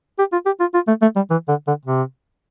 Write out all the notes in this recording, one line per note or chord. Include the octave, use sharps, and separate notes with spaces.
G4
F4
G4
F4
F4
A3
A3
G3
E3
D3
D3
C3